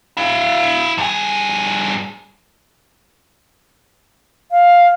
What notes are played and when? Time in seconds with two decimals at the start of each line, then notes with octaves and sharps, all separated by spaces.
0.17 E4 F5
0.98 G2 G#4
4.51 F5